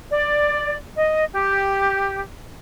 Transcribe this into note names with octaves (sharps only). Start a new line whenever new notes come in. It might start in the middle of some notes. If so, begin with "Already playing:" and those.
D5
D#5
G4